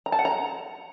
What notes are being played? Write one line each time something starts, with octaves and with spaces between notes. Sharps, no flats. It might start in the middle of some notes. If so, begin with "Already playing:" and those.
A#5
A5
F#5
A#5